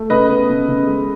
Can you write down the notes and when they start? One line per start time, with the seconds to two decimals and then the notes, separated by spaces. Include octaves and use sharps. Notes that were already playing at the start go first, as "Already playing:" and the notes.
Already playing: A3
0.10 C#3 B4 D#5
0.29 B3
0.49 C#3
0.68 C#3
0.87 G#3